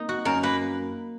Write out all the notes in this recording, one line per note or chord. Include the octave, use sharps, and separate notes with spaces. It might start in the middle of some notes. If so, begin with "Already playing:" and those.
Already playing: A#3 D#4
F#4
F#2 A#4
A#3 B4